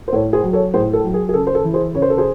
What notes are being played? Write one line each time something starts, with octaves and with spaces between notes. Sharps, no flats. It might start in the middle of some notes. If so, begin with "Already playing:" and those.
C5
A2 A4 C#5
G#4 C5
F#3
A4 C#5
A2 G#4 C5
A4
F#3
G#4
G#4
C#3 A4
C5
A4
E3
G#4 C5
C#3 C#5
C5
A4
G#4 C5